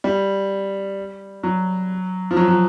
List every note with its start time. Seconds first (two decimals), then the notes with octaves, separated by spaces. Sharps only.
0.04 G3
1.43 F#3
2.31 F3
2.37 F#3
2.48 F#3